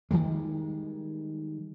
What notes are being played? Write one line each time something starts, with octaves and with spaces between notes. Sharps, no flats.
D#3 E3 G3 G#3